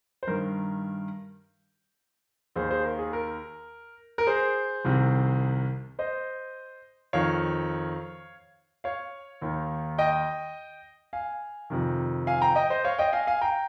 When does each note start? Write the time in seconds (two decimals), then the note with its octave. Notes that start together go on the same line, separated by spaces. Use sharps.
0.23 C5
0.27 G2 D#3 A#4
2.56 D#2 D#3 G#4 C5
2.71 G#4 C5
2.85 A#4
2.99 G#4
3.13 A#4
4.18 A#4
4.27 G#4 C5
4.85 C2 C3 D#3
5.99 C5 D#5
7.13 F2 D#3 C#5 F5
8.84 C#5 F5
9.42 D#2 D#3
9.98 D#5 G5
11.13 F5 G#5
11.70 F2 C3 D#3
12.27 F5 G#5
12.41 G5 A#5
12.56 D#5 G5
12.70 C5 D#5
12.84 C#5 F5
12.98 D#5 G5
13.13 F5 G#5
13.27 F5 G#5
13.41 G5 A#5